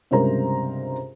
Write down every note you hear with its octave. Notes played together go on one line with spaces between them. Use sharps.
C#2 G2 C3 A#4 C5 A#5